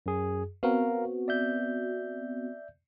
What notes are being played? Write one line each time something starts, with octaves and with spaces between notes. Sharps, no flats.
F#2 G#4
B3 C4 F#4 A#4 F5
D5 E5 G6